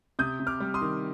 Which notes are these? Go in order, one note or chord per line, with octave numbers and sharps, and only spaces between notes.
C3 D#6 G6
C3
D6 F6
G3
C6 D#6
D#3